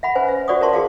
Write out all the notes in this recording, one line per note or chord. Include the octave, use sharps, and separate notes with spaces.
E5 F#5 B5
C#4 B4 C5 G#5
E5
F#4 C5 D5 F#5 C#6 D#6
A#4 B4 E5 A5 C6
F#4 G#4 F5